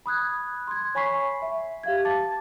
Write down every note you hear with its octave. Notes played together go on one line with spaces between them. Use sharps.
B5 D#6 F#6 G#6
C6 G#6
C#5 G#5 B5 C#6 B6 C7
E5
G4 F5 G#6
A5 D6 A6